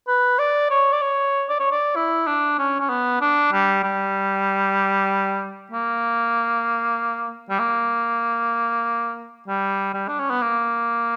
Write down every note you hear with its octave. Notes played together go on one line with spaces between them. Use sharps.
B4
D5
C#5
D5
C#5
D5
C#5
D5
E4
D4
C#4
C#4
B3
D4
G3
G3
A#3
G3
A#3
G3
G3
D4
C#4
B3
A#3